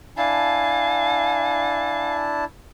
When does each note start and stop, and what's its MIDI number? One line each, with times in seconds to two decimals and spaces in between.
0.17 2.45 62
0.17 2.45 64
0.17 2.16 77
0.17 2.26 80
0.17 2.45 81